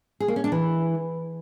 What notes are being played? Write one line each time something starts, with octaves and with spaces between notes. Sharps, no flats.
G#4
A#3
C#4
D4
E3